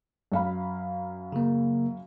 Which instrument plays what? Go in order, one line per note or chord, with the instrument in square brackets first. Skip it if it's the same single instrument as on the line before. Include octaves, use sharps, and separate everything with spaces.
[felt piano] F#2 F5 B5
[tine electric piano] C#3 A#3